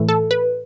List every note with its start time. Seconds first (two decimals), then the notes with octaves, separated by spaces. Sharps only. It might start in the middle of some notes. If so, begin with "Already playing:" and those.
Already playing: A2 E3 A3
0.09 A4
0.31 B4